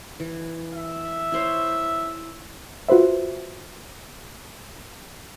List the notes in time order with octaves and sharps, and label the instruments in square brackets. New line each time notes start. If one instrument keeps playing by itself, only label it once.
[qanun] E3
[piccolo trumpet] E5
[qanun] E4 C5 C#5
[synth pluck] F4 F#4 B4 C5 E5